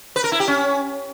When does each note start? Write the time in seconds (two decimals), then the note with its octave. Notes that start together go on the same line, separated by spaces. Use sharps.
0.16 B4
0.24 A#4
0.32 E4
0.40 G4
0.48 C#4